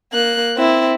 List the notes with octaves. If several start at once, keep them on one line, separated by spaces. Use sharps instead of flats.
A#3 F#6
C4 E4